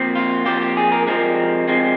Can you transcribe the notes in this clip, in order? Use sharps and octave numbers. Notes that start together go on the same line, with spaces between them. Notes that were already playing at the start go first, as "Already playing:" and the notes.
Already playing: A#2 F3 C4
F4
A#2 F3 C4 G4
G4
G#4
A#4
C2 C3 F3 G#3 C4 A#4
C2 C3 F3 G#3 C4